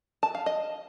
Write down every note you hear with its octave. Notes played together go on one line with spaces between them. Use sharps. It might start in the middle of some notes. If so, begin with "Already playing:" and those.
A5
F5
D#5